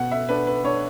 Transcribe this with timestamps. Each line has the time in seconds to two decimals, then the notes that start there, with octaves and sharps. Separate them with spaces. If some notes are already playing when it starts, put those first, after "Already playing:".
Already playing: B2 F#5
0.11 E5
0.29 D4 B4
0.47 B4
0.64 D4 C#5